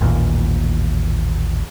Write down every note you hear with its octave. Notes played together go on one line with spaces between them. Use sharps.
A1 D#2 A#2